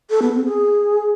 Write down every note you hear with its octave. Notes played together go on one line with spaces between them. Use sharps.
A4
B3
C4
G#4